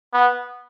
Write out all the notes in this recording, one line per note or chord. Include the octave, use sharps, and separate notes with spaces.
B3